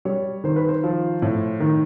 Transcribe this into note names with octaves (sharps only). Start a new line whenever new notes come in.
G3 C#5
D#3 C5
B4
C5
F3
A2
D#3